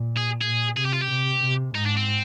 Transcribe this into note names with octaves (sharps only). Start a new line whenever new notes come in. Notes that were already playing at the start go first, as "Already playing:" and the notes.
Already playing: A#2
G#4
A#2 G#4
C3 G#4
G4
F4
G4
C3
C3
G#2 D#4
D4
C4